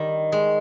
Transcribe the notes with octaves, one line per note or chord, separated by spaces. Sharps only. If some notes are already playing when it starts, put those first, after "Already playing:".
Already playing: D#3 G3
G#3